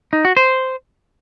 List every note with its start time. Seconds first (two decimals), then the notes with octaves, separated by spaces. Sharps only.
0.13 D#4
0.25 F#4
0.37 C5